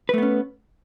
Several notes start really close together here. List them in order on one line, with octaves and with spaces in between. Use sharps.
B4 A3 B3 C#4